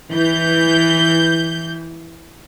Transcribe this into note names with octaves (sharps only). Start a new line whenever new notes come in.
E3 G6